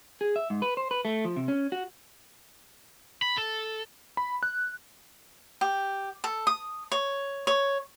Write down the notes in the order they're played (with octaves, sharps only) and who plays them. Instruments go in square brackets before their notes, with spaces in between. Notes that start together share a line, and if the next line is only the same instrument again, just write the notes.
[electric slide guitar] G#4
E5
G#2
B4
C5
B4
A3
F3
C3
C#4
F#4
[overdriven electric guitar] B5
A4
[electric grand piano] B5
F#6
[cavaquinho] G4
A4
D#6
C#5
C#5